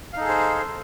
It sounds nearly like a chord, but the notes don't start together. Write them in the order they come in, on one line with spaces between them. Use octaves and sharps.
F5 D#4 A4 G#4 C5